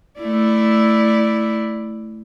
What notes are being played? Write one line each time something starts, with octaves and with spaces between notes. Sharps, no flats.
A3 E4 D5